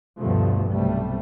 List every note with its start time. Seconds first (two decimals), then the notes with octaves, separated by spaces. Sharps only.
0.19 D2 G2 B2 D3 F3 A3
0.68 B1 C3 G3 A3